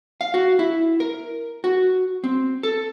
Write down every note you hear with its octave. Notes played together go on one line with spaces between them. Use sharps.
F5
F#4
E4
A#4
F#4
C4
A4